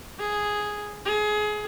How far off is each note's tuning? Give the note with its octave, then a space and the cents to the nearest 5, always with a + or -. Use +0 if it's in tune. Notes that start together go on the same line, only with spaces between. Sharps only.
G#4 +0
G#4 +25